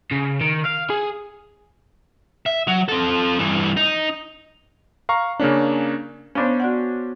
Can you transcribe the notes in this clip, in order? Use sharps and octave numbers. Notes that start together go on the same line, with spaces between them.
C#3
D#3
F5
G#4
E5
F#3
C4 A4
G2 E3
D#4
F5 A#5 C#6
C#3 A#3 C#4 D4
B3 C#4 D4 C5 F5
F#4 D5 F#5